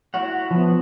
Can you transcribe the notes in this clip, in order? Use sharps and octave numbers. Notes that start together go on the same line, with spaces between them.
E4 F#4 C#5 F#5
F3 B3